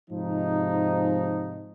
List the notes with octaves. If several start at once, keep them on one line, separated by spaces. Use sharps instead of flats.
G#2 C3 F3 D#4